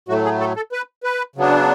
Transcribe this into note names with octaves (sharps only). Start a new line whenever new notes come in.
A2 F#3 A3 F#4
G#4
A4
A4
B4
B4
C#3 F#3 B3 D4